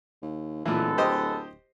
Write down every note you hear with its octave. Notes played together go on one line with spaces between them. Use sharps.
D#2
D1 A#2 E3 G#3 B3 A4
G4 C5 D#5